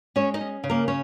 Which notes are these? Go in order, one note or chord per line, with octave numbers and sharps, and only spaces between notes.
G#3 C#4 C#5
D#4 D#5
C#4
C#3
A#3 A#4
C#4 C#5